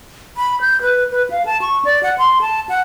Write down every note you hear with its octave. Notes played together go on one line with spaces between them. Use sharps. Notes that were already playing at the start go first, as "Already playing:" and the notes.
B5
G6
B4
B4
F5
A5
C#6
D5
F#5
C6
A5
F#5